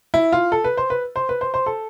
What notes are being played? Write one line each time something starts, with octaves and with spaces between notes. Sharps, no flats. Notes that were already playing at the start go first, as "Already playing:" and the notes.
E4
F4
A4
B4
C5
B4
C5
B4
C5
C5
A4